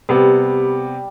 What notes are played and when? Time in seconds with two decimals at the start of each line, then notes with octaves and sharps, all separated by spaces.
0.09 C3 G3 B3